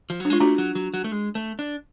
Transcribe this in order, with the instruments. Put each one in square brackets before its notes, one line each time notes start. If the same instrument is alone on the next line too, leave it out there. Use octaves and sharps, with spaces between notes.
[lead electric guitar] F3
F#3
[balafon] D4
[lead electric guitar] G#3 [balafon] F4
[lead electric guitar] A3 [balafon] D4 F#4
[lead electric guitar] F#3
F#3
F#3
A3
G#3
A3
D4